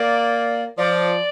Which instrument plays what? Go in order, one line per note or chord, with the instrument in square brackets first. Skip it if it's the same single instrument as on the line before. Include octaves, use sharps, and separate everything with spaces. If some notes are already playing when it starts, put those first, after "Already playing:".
Already playing: [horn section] A#3 [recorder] D5
[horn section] F3 [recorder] D5